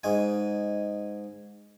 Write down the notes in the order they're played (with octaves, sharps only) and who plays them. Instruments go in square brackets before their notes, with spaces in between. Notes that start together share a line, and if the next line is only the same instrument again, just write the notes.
[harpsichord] G#2 D#4 G#5